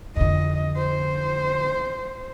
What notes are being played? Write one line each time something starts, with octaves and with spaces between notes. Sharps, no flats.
F2 D3 D#5
C5